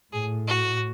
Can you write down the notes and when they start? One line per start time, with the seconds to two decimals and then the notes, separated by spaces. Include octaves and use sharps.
0.13 A2 G#4
0.47 F#4